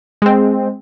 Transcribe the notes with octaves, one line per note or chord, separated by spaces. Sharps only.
G#3 C4